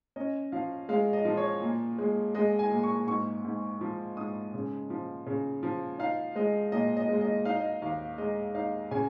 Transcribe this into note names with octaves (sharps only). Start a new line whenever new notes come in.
C#4 D#5
F3 F5
G#3 F5
D#5
F3
C#5
A#2
G#3
G#3 D#5
G#5
A#2
C#6
G#2 C#6
G#2
F3
G#2 D#6
C#3
F3
C#3
F3
D#4 F5
G#3 D#5
A#2 D#5
D#5
G#3
D#5
D#4 F5
D#5
F5
D#2 F5
G#3 D#5
D#4 F5
C#3 G#5